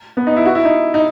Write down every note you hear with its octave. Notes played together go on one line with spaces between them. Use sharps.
B3
D#4
E4
F#4
E4
D#4
D#4